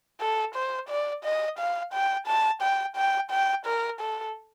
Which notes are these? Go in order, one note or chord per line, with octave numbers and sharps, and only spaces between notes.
A4
C5
D5
D#5
F5
G5
A5
G5
G5
G5
A#4
A4